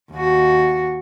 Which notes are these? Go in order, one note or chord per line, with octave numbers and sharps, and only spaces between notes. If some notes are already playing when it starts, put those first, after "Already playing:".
D#2 F#4